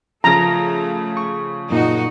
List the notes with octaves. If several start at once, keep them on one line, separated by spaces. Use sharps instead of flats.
C#3 F3 A3 A#5
C#6
F#2 A#2 D#4 F#4